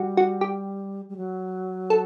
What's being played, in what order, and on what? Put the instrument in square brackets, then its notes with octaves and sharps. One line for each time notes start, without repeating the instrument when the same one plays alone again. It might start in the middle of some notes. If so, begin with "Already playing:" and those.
Already playing: [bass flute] G3 [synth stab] F#4
[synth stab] F#4
G4
[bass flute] G3
F#3
[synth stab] A4